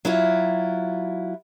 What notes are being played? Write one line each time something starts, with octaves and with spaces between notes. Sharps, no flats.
F#3 E4 F4